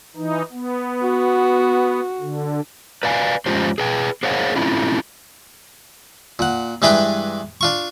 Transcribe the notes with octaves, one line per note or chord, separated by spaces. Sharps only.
E3 D#4
B3
F#4
D3
B4 D5 F5 G#5
F2 G#3 C#4 F4 G4 C5
G#4 B4 G5
G#4 A#4 C5 C#5 F5 F#5
A3 C4 C#4 E4 F4
A#2 F#5
G2 E3 G#3 D4 B4 G5
D4 F4 C#6